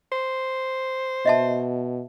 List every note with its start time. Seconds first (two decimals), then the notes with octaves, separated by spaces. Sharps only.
0.12 C5
1.26 B2 D#5 E5 A5